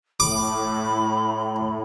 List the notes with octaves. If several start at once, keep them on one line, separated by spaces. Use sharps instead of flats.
A2 B5 D6